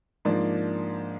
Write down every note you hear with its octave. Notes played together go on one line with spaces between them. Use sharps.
G#2 F3 A#3 D4